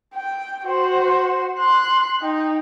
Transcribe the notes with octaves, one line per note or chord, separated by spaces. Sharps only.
G5
F#4 C5
C6 F#6
D#4 G5